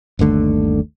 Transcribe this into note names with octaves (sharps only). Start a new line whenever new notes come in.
G1 D#2 D3 A3